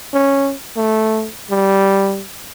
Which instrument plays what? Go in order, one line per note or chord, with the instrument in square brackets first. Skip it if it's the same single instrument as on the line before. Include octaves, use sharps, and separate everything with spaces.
[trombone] C#4
A3
G3